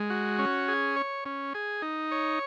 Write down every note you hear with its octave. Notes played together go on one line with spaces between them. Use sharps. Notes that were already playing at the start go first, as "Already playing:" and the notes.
Already playing: G#3
F#4
C#4
G#4
C#5
C#4
G#4
D#4
C#5